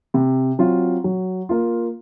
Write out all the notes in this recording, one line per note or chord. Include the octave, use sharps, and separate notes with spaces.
C3
F#3 C4 F4
F#3
A#3 F4